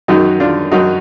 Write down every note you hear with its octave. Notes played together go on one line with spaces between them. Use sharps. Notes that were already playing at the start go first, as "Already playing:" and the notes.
F#2 D#3 F#3 D#4 F#4
D4 F4
F#2 D#3 F#3 D#4 F#4